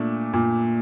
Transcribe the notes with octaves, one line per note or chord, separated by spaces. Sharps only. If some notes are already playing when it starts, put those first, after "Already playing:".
Already playing: A#2 A3 D4
A#2